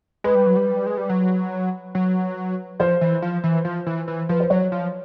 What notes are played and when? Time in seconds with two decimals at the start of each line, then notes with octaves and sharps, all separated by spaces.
0.24 G#3 B4
0.35 G3
0.46 F#3
0.56 G3
0.86 G#3
0.97 G3
1.09 F#3
1.95 F#3
2.80 F3 C5
3.01 E3
3.22 F3
3.44 E3
3.65 F3
3.86 E3
4.08 E3
4.29 F3 B4
4.40 C5
4.50 F#3 C#5
4.72 F3